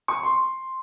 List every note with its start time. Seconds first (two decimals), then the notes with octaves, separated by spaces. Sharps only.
0.08 C#6
0.23 C6